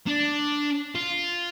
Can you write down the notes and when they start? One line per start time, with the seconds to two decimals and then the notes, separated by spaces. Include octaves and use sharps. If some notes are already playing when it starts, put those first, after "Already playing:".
0.07 D4
0.95 F4